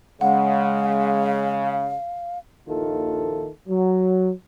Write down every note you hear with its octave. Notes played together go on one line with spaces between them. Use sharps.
C#3 G#3 F5 F#5
A#1 D#2 D#3 E4 F4 A4
F#3